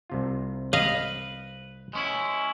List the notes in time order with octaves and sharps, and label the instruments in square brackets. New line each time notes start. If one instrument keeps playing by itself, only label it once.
[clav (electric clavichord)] C2 C3 F4
[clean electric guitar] B4 [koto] D#5 F5
[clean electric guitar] G#3 C#4 E4